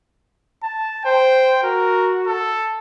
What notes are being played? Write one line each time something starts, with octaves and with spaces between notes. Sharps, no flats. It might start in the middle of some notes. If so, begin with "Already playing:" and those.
A5
C5 G5
F#4 A#4
A4